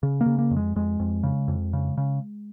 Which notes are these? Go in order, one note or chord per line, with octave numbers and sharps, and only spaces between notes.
C#3
A#3
C#3
A#3
F2
G#3
F2 G#3
F2
C#3
F2
C#3
C#3